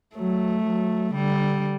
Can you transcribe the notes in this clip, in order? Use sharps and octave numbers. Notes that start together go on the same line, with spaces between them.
F#3 A3
F#3
D3 G3